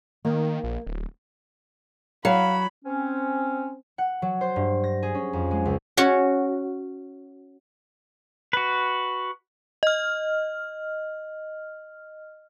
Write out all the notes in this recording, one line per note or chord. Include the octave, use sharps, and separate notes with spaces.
D#3 A#3
A#1
D1
F#3 F5 B5
C4 C#4
F#5
F#3
C5
G2
A#6
G#4
C#4
F2
G#3
C#2
C#4 F#4 C#5
F#4 B4
D#5 F6